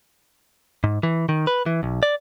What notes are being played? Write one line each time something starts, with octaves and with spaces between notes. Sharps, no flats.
G#2
E3
D#3
B4
E3
B1
D5